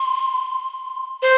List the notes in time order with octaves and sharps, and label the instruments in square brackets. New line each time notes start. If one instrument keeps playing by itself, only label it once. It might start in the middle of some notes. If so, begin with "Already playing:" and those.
Already playing: [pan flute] C6
[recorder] C5 [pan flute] C6